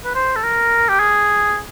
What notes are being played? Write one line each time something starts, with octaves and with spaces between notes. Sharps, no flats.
B4
C5
A4
A#4
G4
G#4